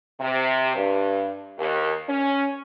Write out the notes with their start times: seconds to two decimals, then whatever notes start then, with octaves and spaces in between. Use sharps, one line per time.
0.20 C3
0.75 G2
1.59 D#2
2.08 C#4